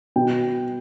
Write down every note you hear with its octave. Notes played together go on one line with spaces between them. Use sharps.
B2 G5